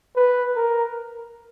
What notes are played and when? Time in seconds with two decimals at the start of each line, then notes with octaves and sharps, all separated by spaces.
0.16 B4
0.56 A#4